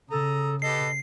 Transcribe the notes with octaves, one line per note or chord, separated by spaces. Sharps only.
C#3 A4 A#5 D#6
G4 A4 B4 D#5 C7